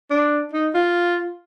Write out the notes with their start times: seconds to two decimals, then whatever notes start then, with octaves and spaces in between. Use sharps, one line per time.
0.11 D4
0.53 D#4
0.74 F4